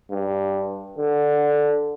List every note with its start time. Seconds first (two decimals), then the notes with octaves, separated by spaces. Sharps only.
0.11 G2
0.98 D3